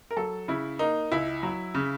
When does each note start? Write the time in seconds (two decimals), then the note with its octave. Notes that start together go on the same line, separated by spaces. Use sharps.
0.11 A#4
0.17 F#3 A4
0.48 C#3 E4
0.79 A#3 D#4
1.12 C#2 E4
1.43 F#3
1.75 C#3